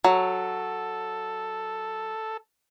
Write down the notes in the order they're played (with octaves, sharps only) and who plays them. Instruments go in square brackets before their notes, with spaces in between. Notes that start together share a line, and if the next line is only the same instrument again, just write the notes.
[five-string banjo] F#3 [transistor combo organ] A4